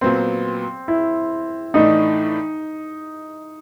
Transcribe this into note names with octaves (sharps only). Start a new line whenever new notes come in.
A#2 F#3 B3 C4
E4
A2 E3 A3 D4 D#4